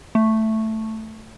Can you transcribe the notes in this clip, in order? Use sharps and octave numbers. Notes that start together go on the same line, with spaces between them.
A3